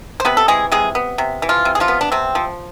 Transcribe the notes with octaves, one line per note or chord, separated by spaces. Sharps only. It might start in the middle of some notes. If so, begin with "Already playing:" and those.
C5
C3 B3 B4
A4
E3 G#3 G#4
C3 G#3 G#4
B3
C3
E3
F3 F4
C3
G#4
F3 F4
B3
D4
C3 C4
F3